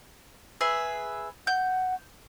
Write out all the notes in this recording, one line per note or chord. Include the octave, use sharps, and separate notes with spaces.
G#4 B4 E5
F#5 G6